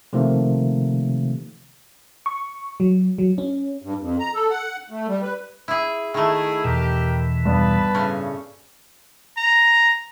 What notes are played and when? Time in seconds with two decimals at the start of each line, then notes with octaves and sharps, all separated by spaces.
0.13 C3 D#3 F3 A3 A#3
2.26 C#6
2.80 F#3
3.18 F#3
3.38 C#4
3.82 G2
4.00 F2
4.19 A#5
4.34 A4
4.50 F#5
4.90 A3
5.08 G3
5.22 B4
5.68 E4 G#4
6.14 D#3 A3 E4 G#4
6.64 E2 B2 E3 G4 A#4
7.45 G2 B3 B4 D5 A5
7.94 A2 C#3 C#4
9.37 A#5